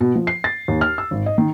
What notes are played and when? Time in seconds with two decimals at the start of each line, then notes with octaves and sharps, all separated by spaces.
0.01 B2
0.15 F3
0.27 C7
0.44 A6
0.68 D#2
0.81 F6
0.98 E6
1.11 G#1
1.26 D#5
1.38 D#3